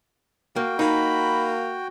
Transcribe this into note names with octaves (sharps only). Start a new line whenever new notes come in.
A#3 F#4 G5
A#3 D#4 B5